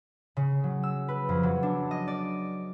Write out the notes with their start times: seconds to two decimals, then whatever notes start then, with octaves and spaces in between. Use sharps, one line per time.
0.37 C#3
0.64 F#3
0.83 E6
1.08 B4
1.29 F2
1.43 F#3
1.63 D4
1.91 D#5
2.08 D5